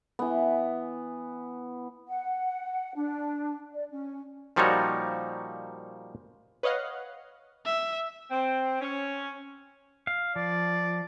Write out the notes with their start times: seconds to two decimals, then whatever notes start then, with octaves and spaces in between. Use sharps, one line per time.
0.19 E3 B3
2.09 F#5
2.95 D4
3.73 D5
3.90 C#4
4.56 A#2 F3 G3 D#4 F#4 C#5
6.63 B4 C#5 D#5 F5 F#5
7.66 E5
8.30 C4
8.80 C#4
10.07 F5
10.36 F3 D5